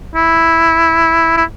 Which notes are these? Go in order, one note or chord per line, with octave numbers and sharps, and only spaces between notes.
E4
E4